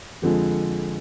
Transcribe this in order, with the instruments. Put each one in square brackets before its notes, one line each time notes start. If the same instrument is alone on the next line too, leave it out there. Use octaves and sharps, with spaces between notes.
[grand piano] F2 D3 F3 G#3